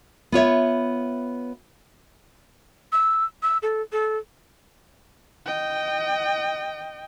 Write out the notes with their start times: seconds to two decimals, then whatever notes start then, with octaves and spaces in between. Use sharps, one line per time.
0.32 B3 F4 C#5 E5
2.92 E6
3.43 E6
3.62 A4
3.92 A4
5.46 D#5 G5